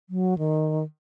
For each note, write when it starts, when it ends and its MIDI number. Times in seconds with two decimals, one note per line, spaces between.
0.10 0.37 54
0.38 0.83 51